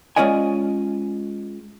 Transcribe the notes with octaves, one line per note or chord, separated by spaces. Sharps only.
G#3 C#4 F4 D5 D#5 G#5